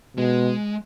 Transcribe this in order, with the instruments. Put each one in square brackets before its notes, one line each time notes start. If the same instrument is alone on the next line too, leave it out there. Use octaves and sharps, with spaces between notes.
[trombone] B2 [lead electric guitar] G#3